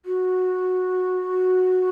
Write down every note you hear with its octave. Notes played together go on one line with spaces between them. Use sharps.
F#4